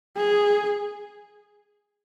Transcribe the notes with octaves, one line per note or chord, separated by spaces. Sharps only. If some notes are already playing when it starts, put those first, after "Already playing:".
G#4